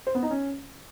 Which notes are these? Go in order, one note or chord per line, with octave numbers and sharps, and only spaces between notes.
C5
B3
D#4
C#4